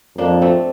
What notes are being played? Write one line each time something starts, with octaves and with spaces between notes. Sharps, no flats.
F2 A#3 D4
A3 C4